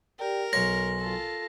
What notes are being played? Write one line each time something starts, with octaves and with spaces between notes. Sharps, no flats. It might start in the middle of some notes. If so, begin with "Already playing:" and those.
G4 A#4 D5 G5
B1 C#5 G#5 C6 A#6
F4 A4